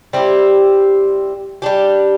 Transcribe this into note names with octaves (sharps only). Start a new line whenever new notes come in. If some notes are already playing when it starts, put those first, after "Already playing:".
G3 C4 E4 G4
G3 D4 G4